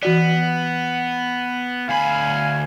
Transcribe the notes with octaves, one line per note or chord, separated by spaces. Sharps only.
E3 B3 F#4 D5
D2 F5 G#5 B5